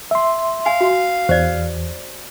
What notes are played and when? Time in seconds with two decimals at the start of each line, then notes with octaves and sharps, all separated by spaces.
0.11 E5 C6
0.66 F5 G#5
0.81 F#4
1.29 E2 C5 D5